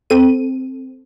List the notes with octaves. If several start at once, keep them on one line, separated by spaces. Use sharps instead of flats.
C4 A4 D#7